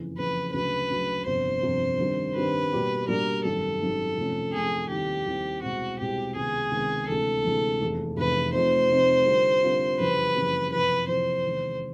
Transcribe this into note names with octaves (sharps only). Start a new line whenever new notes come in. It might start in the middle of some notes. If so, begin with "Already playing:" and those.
Already playing: F#1 F2 C#3 E3
F#1 F2 C#3 E3 B4
D2 C#3 F#3 B4
D2 C#3 F#3
G1 F2 C3 C5
G1 F2 C3
G2 D#3 G3 C4
G2 D#3 G3 C4 B4
B2 G3 A#3 D4 G4
B2 G3 A#3 D4 G4 A#4
G#1 F#2 D#3 G3 A4
G#1 F#2 D#3 G3
F2 C3 F3 A3 C#4
F2 C3 F3 A3 C#4 G#4
D#2 D#3 G3 C4 E4 G4
D#2 D#3 G3 C4 E4
C2 B2 G#3 C4 F#4
C2 B2 G#3 C4 G4
C#2 C3 D#3 G#3 B3 G#4
C#2 C3 D#3 G#3 B3
D2 C3 E3 G#3 A4
D2 C3 E3 G#3
F1 E2 C3
F1 E2 C3 B4
C3 F3 A3 C4 D#4 C5
C3 F3 A3 C4 D#4
D3 G3 C4 F4 A#4
D3 G3 C4 F4 A#4
F#1 F2 C#3 E3 G3 B4
F#1 F2 C#3 E3 G3
F#1 F2 C3 E3 B4
F#1 F2 C3 E3 C5
E2 C3 D#3 G#3